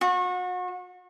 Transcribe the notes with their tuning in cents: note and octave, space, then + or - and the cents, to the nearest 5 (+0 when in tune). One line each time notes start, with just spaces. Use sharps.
F#4 -35